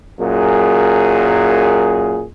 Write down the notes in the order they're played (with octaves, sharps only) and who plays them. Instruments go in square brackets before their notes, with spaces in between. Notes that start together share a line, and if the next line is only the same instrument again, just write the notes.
[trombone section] F#2 A#2 G#4